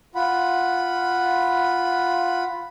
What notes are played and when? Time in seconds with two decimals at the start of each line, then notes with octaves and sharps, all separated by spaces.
0.15 F4 F#5 B5